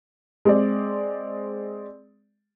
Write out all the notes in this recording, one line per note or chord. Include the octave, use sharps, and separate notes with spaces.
G#3 C4 D5